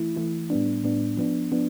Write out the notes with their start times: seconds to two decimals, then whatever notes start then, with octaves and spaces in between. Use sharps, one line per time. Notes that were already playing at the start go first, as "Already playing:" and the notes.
Already playing: E3 A3 E4
0.16 E3 A3 E4
0.50 A2 G3 B3 D4
0.84 A2 G3 B3 D4
1.17 F3 B3 D4
1.52 F3 B3 D4